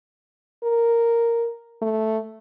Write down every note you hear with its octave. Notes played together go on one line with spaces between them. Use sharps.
A#4
A3